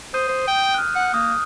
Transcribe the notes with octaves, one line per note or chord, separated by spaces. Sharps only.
C5 D#6 G6 D#7
C5
G5
F6 F#6
F#5
A#3 D#6